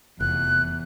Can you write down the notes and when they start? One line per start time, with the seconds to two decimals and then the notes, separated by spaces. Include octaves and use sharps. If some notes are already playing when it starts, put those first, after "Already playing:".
0.20 F1 E2 F#6